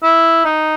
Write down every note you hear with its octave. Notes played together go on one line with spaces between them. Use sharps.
E4
D#4